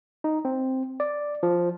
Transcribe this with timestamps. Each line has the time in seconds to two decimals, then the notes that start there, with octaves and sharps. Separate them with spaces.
0.24 D#4
0.45 C4
1.00 D5
1.43 F3